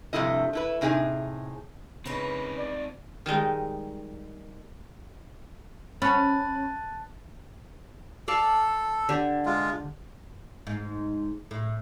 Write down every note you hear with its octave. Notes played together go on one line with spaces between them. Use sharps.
G2 C3 F3 A3 E4 D#5
A3 E4 B4
A2 C3 D#4 G#4 G#5
C#3 C4 D#4 A#4 B4
D5
D#3 G3 G#3 D#4
C#4 A5 B5 F#6 A6
A4 D5 F5 A5
D3 G4
G#3 F4
G#2
A2